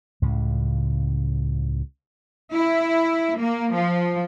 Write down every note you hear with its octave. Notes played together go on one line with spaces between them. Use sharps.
C#2 A2 C#3
E4
A#3
F3